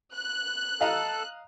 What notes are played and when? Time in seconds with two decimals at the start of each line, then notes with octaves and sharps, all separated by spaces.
0.14 F#6
0.81 A4 D#5 F5 A#5